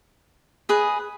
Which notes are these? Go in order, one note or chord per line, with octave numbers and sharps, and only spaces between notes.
G#4 B4 D#5